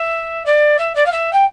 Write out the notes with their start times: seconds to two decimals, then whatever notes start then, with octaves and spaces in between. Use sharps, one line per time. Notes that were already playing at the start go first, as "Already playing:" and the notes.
Already playing: E5
0.45 D5
0.78 E5
0.95 D5
1.05 F5
1.11 E5
1.32 G5